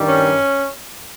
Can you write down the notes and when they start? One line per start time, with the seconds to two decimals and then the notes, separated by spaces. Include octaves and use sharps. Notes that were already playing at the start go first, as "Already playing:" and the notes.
Already playing: G2 D#3 G3
0.09 C#4